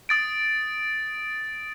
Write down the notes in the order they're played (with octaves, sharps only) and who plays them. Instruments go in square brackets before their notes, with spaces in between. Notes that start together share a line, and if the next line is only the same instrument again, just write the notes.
[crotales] D#6 A6 D7